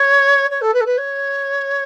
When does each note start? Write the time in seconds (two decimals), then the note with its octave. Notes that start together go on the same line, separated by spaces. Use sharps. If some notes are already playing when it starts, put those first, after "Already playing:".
Already playing: C#5
0.50 C#5
0.61 A4
0.74 B4
0.81 A4
0.86 B4
0.98 C#5